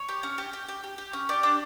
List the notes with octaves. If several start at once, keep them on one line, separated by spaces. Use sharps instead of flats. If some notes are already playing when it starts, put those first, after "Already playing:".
Already playing: C#5
G4
C#4
G4
G4
G4
G4
G4
C#4
G4 D5
D4